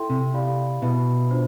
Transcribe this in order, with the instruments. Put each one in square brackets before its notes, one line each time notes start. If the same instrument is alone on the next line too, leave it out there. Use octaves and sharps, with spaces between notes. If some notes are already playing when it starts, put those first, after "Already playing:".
Already playing: [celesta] E4 A4 E5 G5 C6
[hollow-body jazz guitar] C3
[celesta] E4 G4 D5 F5 B5
[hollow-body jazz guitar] B2 [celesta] E4 B4 E5 B5
[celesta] D4 F4 C5